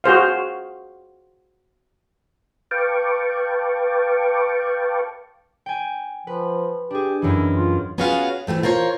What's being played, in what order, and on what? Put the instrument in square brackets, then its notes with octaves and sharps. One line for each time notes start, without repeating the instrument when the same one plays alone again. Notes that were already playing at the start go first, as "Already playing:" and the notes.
[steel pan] F#4 G#4 C5 F5
[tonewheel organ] B4 F5 G5 A5 C#6 D6
[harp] G5 G#5
[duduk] F3 [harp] B4
[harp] D4 G#4 [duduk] G4
[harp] F#2 D#3 E3 [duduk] E4
[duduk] F4
[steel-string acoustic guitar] B3 C#4 F4 F#4 G#4 F5
E3 F#3 A3 C4
F4 A#4 C5 C#5